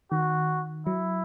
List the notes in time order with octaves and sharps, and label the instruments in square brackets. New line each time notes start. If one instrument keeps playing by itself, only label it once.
[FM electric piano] D#3 [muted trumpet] F#4
[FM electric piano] F#3 [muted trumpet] E4